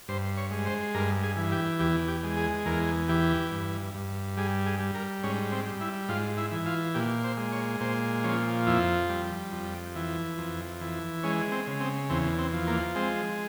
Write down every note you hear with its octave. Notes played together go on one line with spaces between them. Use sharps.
G2 C5
C#5
G#3
C5
G2 A#4
G#4
E3
G4
E2 G4
G4
G#3
G#4
E2 A#4
E3 G4
G2
G2
G3 G#4
G#4
G3
A#4
G#2 C#4
C4
G3
E4
G#2 F4
E4
E3
F4
A#2 G4
C5
G#3
C#5
A#2 C5
F3 C#4
F2 E4
G3
F2
E3
F2
E3
G#3 C#4
C4
C#3
C4
E2 C4
C4
F3
A#3
G#3 C4